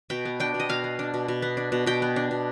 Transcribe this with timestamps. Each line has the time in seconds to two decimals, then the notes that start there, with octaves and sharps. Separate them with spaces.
0.10 B2 G5
0.25 B3
0.40 D4 G5
0.54 B2
0.60 D#5
0.69 B2 F5
0.84 B3
0.99 D4
1.14 B2
1.28 B2
1.42 B3
1.57 D4
1.72 B2
1.86 B2 G5
2.02 B3
2.16 D4
2.31 B2